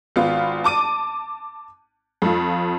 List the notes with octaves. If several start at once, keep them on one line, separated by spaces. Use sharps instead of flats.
G#1 B3 F4
A5 D6 D#7
F2 F3